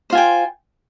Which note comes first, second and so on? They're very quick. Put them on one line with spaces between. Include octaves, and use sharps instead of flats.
C5 F4 G#5 G5